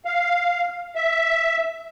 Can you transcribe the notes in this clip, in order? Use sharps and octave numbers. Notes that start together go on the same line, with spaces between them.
F5
E5